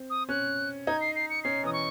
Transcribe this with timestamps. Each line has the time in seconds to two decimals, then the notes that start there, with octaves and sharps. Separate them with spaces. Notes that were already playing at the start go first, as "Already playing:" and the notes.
Already playing: C4
0.10 D#6
0.29 C#4 F#6
0.87 D#4 G#6
1.01 C7
1.16 C7
1.30 C#7
1.44 C#4 C7
1.64 E3 D#6
1.73 C#6